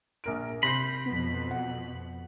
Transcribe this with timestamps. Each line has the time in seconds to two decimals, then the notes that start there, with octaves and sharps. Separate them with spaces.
0.24 A#1 A#4 D7
0.63 C3 B5 C6 G6 A#6 C7
1.06 F2 B2 B3
1.51 F#5